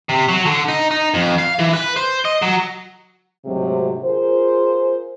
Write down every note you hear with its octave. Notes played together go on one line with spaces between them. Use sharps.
C3
F#3
D3
D#4
D#4
F2
F5
E3
B4
C5
D#5
F#3
D2 G#2 C3 F#3 G#3 C4
F4 G#4 A#4 C5